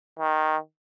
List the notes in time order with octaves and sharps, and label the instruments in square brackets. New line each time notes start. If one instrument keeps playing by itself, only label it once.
[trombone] D#3